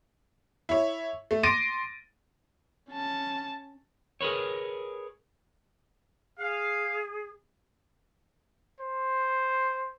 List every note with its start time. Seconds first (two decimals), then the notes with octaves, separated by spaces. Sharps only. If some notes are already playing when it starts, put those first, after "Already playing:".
0.69 E4 C#5
1.31 A3
1.43 C6 D6 A6 A#6 D7 D#7
2.89 C#4 A5
4.21 G#4 A#4 B4 C#5
6.38 G#4 F5
8.80 C5